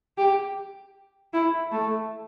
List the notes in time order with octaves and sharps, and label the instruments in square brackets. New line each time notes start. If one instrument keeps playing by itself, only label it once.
[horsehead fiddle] G4
E4
A3